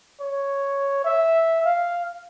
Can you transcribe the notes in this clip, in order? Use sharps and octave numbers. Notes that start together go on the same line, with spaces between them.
C#5
E5
F5